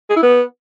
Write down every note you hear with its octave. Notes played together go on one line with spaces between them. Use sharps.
G#4
E4
B3